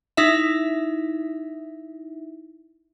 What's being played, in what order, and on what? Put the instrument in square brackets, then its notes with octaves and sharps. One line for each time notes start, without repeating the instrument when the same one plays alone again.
[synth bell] D#4 E4 E5